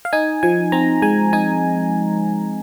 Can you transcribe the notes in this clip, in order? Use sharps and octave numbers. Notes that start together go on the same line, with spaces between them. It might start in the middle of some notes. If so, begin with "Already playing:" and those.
F5
D#4 G#5
F3 G#5
C4 A#5
G#3 G#5
D#4 G#5